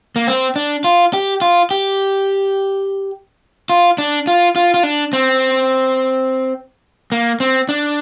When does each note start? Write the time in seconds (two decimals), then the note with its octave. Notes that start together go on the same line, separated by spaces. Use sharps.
0.16 A#3
0.28 C4
0.56 D4
0.84 F4
1.13 G4
1.41 F4
1.71 G4
3.69 F4
3.98 D4
4.27 F4
4.56 F4
4.74 F4
4.83 D4
5.13 C4
7.12 A#3
7.40 C4
7.69 D4